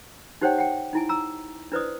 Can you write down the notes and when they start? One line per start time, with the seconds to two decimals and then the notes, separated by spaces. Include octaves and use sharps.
0.41 D#4 G4 C5 C#5 F#5 G5
0.58 F#5 G5
0.93 D#4 E4 G#5
1.09 A#5 E6
1.72 D4 E4 B4 C5 D5 D#6